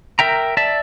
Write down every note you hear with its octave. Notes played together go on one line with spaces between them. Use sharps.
A#4 E5 G5 A#5
D5 E5 A5